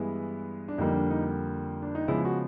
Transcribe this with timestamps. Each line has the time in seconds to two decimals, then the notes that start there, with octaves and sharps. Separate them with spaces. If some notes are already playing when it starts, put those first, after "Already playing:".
Already playing: G2 E3 G#3 B3 E4
0.68 D4
0.78 F2 D3 G3 A#3 D#4
0.94 D4
1.10 D#4
1.82 D4
1.95 D#4
2.08 C#3 F3 G#3 B3 E4
2.25 F#4